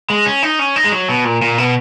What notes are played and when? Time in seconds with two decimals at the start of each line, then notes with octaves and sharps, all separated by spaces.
0.10 G#3
0.26 C#4
0.43 D#4
0.59 C#4
0.76 D#4
0.85 G#3
0.92 F#3
1.09 B2
1.25 A#2
1.42 A#2
1.58 B2